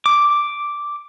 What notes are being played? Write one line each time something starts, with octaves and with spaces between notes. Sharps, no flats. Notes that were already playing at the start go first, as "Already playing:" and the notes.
D6